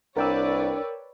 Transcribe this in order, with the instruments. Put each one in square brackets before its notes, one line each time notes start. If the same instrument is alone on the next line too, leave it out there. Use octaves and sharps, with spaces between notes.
[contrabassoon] C2 [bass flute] D4 [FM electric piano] A#4 G5 E6 [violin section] B4 C#5 D5